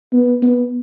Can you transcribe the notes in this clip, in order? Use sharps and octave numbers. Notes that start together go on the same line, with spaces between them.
B3
B3